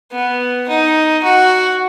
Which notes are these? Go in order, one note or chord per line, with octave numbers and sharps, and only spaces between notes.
B3
D#4
F#4